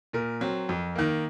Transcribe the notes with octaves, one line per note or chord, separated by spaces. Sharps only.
A#2 A#4
F#3 C4
F2
D#3 A#3